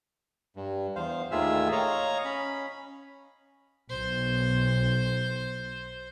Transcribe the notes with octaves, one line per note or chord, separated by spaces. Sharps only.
G2
E2 C5 F5
D#2 A2 D#3 F4 G#4 E5
C#5 D#5 F5 A#5
C#4 B5
B1 C5